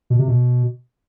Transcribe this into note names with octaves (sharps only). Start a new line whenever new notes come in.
B2
C3
B2